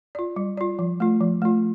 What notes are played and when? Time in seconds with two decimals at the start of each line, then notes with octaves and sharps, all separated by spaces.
0.15 F4 D5
0.36 G3
0.57 F4 D5
0.79 F3
1.00 A3 F4
1.21 F3
1.42 A3 F4